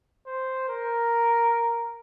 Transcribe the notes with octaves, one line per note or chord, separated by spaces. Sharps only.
C5
A#4